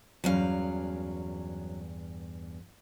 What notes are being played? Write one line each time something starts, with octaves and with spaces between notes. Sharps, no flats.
E2 G2 F#3 C#4 F5